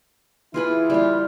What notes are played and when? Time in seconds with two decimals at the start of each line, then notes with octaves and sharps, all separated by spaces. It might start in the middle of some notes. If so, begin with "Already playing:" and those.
0.54 E3 E4 F4 G#4 B4
0.90 G3 F4